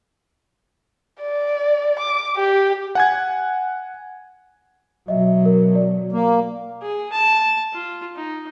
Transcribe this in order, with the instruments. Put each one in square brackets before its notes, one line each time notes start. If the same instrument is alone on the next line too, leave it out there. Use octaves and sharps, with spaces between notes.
[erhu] D5
D6
G4
[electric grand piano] F#5 G#5 G#6
[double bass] B2 F#3 [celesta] D#5 E5
[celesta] A#4
D5
[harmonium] A#3
[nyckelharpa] G#4
A5
F4
D#4